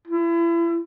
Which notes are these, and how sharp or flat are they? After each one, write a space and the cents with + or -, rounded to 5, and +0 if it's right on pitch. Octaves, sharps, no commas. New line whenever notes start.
E4 +35